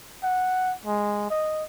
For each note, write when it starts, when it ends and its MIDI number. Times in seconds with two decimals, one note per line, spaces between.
0.23 0.73 78
0.85 1.26 56
1.30 1.64 75